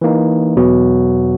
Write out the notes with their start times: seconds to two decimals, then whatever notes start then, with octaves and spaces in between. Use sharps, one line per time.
0.01 E3 A#3 D#4
0.56 E2 B2 F#3 B3 F#4